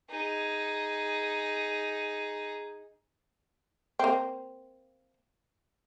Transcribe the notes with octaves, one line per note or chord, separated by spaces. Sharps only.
D#4 G#4
A#3 C4